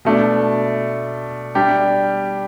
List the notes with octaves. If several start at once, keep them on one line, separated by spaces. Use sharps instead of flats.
B2 A3 D4
G3 D4 G4